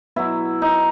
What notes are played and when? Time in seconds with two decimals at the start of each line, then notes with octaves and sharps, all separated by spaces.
0.16 B2 F#3 E4
0.62 D#4